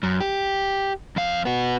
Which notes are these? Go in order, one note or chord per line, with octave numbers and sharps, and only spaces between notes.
F#2
G4
F2 F5
B3 F#4